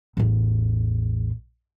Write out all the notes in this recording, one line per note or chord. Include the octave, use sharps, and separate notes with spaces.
A1 E2